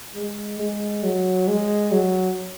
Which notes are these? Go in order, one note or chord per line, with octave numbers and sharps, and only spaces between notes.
G#3
G#3
F#3
G#3
F#3